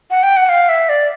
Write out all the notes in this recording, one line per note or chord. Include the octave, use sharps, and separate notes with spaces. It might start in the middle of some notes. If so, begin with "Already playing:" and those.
F#5
G5
F#5
F5
E5
D5